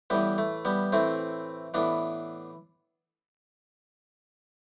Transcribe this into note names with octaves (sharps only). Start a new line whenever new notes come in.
A2 E3 G3 B3
A3
G3 B3
A2 E3 A3 C4
A2 E3 B3 D4